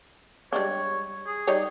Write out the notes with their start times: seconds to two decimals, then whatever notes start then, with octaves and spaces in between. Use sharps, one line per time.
0.53 G3 G#3 D4 C#5
1.27 G#4
1.47 G3 D#4 C#5